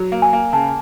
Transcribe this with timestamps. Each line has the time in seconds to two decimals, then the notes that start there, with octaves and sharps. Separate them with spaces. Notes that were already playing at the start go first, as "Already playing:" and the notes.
Already playing: F#3
0.12 A#3
0.22 G#5
0.33 A#3
0.53 C#3 A5